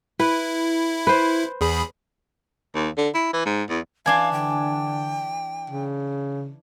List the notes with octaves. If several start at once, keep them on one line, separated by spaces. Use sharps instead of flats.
E4 B4
B4 C5
E2 G#4 B5
D#2
D3
E4
E3
G#2
E2
E3 D4 F5 G#5 C6
D3 G5
C#3